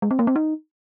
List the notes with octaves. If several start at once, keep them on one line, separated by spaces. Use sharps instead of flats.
G#3
C4
A#3
C4
D#4